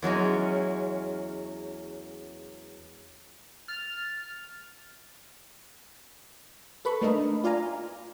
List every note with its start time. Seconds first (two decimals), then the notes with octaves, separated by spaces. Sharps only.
0.02 E2 F#3 G#3 C#4
3.68 F6 A6
6.85 A4 B4 B5 C#6
7.02 A3 A#3 D4 D#4 A#4 D#5
7.44 F4 D5 F5 G#5 A#5